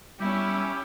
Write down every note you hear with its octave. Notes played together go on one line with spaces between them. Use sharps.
G3 B3 C#4 E4 G4